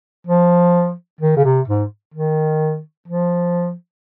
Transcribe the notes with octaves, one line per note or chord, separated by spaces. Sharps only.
F3
D#3
C#3
C3
G#2
D#3
F3